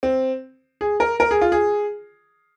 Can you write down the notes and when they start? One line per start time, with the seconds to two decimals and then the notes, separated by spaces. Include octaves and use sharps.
0.03 C4
0.81 G#4
1.00 A#4
1.20 A#4
1.31 G#4
1.41 F4
1.52 G#4